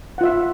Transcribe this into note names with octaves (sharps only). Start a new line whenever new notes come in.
F4 E5 F#5